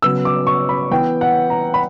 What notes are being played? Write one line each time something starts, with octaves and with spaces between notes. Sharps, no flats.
C#3 F#3 B3 E6
D6
C#6
B5
E3 B3 G5
F#5
A#5
B5